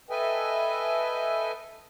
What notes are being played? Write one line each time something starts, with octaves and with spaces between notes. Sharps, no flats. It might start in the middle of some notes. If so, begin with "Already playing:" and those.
A4 B4 D#5 E5 G5 G#5